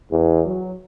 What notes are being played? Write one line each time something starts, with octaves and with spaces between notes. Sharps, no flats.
E2
F#3